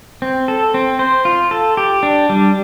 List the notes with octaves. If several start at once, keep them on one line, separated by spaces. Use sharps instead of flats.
C4
A4
C4
C5
F4
A4
G4
D4
G3